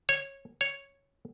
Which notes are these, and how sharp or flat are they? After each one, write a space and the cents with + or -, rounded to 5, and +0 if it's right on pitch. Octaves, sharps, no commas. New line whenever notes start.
C#5 -15
C#5 +0